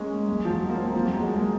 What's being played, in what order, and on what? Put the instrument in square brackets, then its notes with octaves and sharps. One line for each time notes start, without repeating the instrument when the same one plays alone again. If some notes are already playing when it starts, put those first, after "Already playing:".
Already playing: [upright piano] G#3 A#3 C#4
G#3
F3
F#3
A#3
C4
A#3
F3
F#3
G#3
A#3
G#3